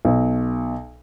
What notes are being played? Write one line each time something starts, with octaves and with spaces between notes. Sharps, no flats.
B1